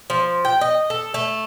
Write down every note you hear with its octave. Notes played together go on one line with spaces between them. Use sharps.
F3
G5
D#5
A4
A3